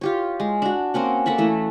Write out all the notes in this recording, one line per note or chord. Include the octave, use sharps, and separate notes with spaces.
F4 G4 C#5
G#3
D4 F#4
A#3 C4 C#4 F#5
A#3 A4 B5 C#6
E3 A3 E5